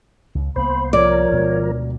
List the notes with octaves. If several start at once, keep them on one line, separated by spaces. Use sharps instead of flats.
C#2
C2 A#3 B3 C5 B5
F3 A#4 C#5 D5
D2 B2 G#3